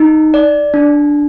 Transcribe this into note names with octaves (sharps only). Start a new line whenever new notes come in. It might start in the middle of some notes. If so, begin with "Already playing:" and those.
Already playing: D#4
D5
D4